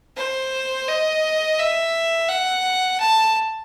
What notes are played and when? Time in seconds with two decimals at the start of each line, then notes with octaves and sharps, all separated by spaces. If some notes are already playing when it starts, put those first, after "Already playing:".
0.16 C5
0.88 D#5
1.59 E5
2.28 F#5
3.00 A5